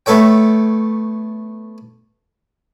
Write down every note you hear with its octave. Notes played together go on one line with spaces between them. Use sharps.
A3 B3 A4 C#5 G5